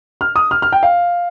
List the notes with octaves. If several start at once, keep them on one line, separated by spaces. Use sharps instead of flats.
F6
D#6
F6
F6
G5
F5